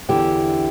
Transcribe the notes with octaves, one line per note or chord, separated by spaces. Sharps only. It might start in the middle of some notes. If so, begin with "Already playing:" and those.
E2 D3 E4 G4